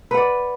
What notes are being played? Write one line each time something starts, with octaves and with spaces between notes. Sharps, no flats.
B4 D5 F#5